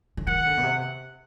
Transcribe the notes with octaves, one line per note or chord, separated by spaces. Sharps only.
D3
D#3 F#5
D3
B2
C3